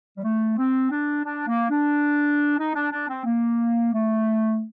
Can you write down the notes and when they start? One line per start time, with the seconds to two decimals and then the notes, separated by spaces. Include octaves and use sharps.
0.17 G3
0.24 A3
0.57 C4
0.91 D4
1.24 D4
1.47 A#3
1.69 D4
2.58 D#4
2.75 D4
2.92 D4
3.09 C4
3.25 A#3
3.92 A3